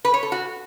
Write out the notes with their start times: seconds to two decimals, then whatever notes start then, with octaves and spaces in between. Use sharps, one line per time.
0.05 B4
0.14 C#5
0.23 A4
0.32 F#4